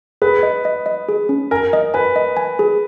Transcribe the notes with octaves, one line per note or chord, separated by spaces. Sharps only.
G#4 B4
D#5
D#5
D#5
G#4
C#4
A#4 G#5
D#5
B4 G#5
D#5
G#5
G#4